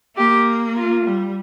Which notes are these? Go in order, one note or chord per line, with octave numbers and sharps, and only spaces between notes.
A#3 G4
F4
G3